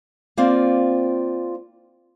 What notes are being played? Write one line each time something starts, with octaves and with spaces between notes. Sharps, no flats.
A#3 C4 F4 D5